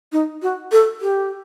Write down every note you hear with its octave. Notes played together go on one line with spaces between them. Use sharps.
D#4
F#4
A4
G4